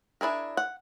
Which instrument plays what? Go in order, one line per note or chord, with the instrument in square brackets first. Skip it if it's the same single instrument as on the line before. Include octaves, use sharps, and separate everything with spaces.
[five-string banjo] D4 E4 G#4 A#4
F#5